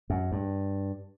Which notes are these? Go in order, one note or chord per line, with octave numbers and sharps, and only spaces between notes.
F#2
G2